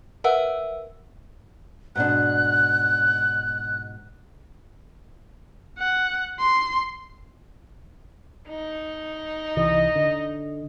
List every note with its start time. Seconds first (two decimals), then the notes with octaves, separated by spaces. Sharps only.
0.24 A#4 B4 E5 F#5 E6
1.95 G#2 B2 D4 F#6
5.79 F#5
6.40 C6
8.48 D#4
9.56 C2 E3 D#5
9.95 D3